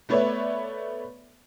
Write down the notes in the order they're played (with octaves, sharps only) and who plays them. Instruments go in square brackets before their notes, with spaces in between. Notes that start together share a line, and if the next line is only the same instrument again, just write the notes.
[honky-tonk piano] A3 B3 B4 C#5 D5 E5